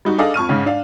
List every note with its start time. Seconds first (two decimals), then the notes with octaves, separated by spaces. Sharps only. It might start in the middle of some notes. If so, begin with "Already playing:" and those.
0.05 G3 D#4 F#4
0.18 D4 G#4 A4 D5 D#5 F5
0.34 F2 C#6 F6 D#7
0.49 G#2 C#3
0.66 D4 F5